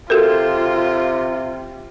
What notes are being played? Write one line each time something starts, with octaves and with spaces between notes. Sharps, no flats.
C3 F4 F#4 A4 A#4